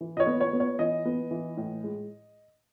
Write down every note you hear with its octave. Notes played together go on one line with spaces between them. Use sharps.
E3
D#5
C#5
B3
C#5
B3
C#5
E3 D#5
B3
E3
A2
G#3